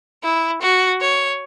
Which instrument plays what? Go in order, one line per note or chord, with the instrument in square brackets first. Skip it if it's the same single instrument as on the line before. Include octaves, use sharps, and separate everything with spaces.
[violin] E4
F#4
C#5